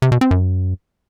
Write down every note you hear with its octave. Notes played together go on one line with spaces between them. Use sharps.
C3
B2
C4
F#2